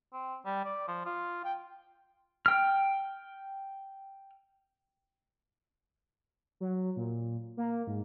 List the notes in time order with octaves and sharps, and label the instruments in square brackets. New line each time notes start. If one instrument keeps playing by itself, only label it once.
[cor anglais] C4
G3
D5
F3
F4
G5
[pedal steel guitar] G5 F6
[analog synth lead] F#3
A#2
A#3
G#2